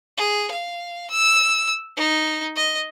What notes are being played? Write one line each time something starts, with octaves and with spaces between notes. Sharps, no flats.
G#4
F5
E6
D#4
D#5